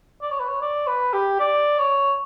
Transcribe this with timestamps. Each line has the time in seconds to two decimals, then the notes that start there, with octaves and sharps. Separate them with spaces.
0.22 D5
0.31 C#5
0.40 B4
0.48 C#5
0.61 D5
0.87 B4
1.13 G4
1.40 D5
1.79 C#5